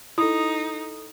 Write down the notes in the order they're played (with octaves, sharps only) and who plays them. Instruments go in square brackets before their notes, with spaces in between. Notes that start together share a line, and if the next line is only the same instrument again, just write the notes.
[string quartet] D#4 [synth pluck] E4 [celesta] A4 D#6